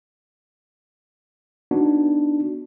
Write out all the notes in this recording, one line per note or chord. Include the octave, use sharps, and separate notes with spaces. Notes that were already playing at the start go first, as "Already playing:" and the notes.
B3 D4 D#4 F#4